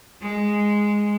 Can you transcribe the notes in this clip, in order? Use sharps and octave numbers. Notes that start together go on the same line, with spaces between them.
G#3